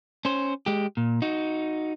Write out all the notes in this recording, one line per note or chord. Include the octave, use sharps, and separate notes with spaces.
C#4 C5
G#3 G4
A#2
D#4 F#4